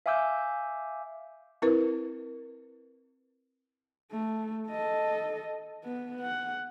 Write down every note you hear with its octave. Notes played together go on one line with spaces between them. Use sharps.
E5 F5 G#5 D6 E6 G6
C4 E4 A#4 B4
A3
A4 D#5
B3
F#5